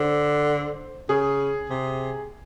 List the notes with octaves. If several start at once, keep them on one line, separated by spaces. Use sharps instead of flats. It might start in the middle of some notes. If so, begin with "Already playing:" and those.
Already playing: D3 C5
C#3 G#4
C3